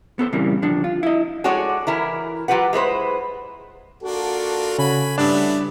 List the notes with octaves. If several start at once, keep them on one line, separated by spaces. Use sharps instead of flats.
B3 A4 C5
A#2 C#3 E3 G3 A#3 C4
D3 F3 D4
F4
E4 D#5
G#3 F#4 A4 C#5 D5
E3 E4 A#4
F#3 F4 G4 B4 F#5
G#3 E4 B4 C5
A#3 D4 F4 F#4 A4
C#3 G#5 B5
G2 A3 B3 D4 E4